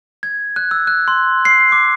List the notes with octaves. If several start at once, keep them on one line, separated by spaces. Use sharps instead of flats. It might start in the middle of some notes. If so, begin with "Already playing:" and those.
G#6
F#6
E6
F#6
C6
C7
D6